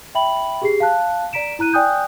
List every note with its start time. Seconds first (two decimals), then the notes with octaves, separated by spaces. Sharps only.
0.15 E5 G5 B5 F#7
0.62 G4 G#4 C7
0.80 F5 A5 F#6
1.33 D5 A#5 B6 D7 E7
1.59 E4 A#5 F#6 D#7
1.73 D5 G5 G#5 D#6 F#6 G6